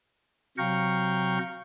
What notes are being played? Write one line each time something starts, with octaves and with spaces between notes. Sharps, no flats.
C3 F#3 F5 G5 A#5 C#6